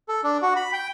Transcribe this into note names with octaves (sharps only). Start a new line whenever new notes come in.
A4
D4
F#4
B5
G5